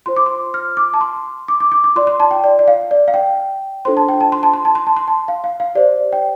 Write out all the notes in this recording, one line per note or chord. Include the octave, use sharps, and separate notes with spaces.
F4 C5 C6
D6
C6
F6
D6
A5
C6
D6
D6
D6
D6
F4 D5 C6
C6
A5
G5
D5
D5
F5
D5
F5
G5
D4 F4 A4 C5 C6
A5
G5
A5
C6
A5
C6
A5
C6
A5
C6
A5
F5
F5
F5
G4 C5 D5
G5